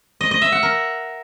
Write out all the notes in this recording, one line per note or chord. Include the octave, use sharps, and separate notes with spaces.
D#5
D#5
E5
F#5
A#4